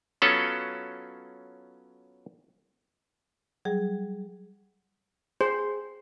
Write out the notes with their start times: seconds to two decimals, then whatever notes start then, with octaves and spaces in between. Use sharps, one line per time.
0.22 F#3 B3 C#4 F4 A4
3.65 F#3 G3 G#4
5.41 G#4 C5